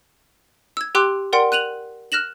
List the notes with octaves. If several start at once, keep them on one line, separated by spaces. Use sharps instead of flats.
E6 G#6
G4 G5 C6 D6 E6 F#6
A#4 D5 F#5 G5 C6
F#6 D#7 F7 F#7
F6 F#6 A#6 E7 F#7